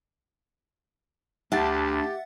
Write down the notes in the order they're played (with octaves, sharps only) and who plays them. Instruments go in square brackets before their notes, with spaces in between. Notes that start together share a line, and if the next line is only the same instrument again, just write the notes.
[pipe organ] D2 [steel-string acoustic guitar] D4 A5 [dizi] G4 [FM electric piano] E5 F#5 A6